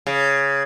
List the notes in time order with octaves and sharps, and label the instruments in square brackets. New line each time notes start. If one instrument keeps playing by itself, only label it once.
[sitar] C#3